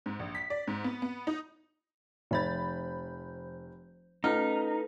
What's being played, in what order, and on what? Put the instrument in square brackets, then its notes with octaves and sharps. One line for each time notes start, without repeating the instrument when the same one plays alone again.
[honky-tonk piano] G#2
A#1
B6
D5
G#2
B3
B3
D#4
[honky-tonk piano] F1 B5 A6 [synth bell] F3 C5 G6
[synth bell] A3 C#4 [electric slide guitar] D#4 [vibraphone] A4 B4 [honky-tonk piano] F6